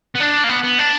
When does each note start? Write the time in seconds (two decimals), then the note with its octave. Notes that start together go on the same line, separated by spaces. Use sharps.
0.15 B3
0.20 D4
0.44 A#3
0.49 B3
0.63 B3
0.79 D4